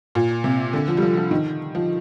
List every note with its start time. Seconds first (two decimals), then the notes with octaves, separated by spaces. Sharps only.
0.15 A#2
0.44 C3
0.73 D3
0.88 F3
0.97 G3
1.02 F3
1.17 F3
1.31 D#3
1.75 F3